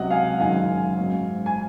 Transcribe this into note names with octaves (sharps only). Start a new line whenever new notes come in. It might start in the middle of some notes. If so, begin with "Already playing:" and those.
Already playing: C#2 C3 F#3 C#4 D#5 F#5
F5 G#5
F#1 F#2 D#3 G#3 F5 G#5
G#2 F#3 C#4
G#5